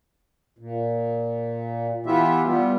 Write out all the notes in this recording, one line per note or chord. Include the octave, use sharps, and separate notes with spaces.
A#2
E3 B3 E4 F4 G4 E5
G3 B3 F4 G4